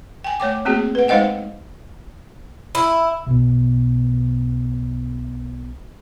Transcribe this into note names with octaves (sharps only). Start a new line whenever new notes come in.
G5 G#5
A3 C#5 G5 D6
A3 A#3 C4 F#4 G#4
B4 F#5
G#3 D#4 C5 D#5 F#5 G5
E4
B1 B2